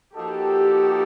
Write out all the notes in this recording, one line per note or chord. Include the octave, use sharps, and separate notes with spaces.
F3 A#3 D#4 F#4 G4 A4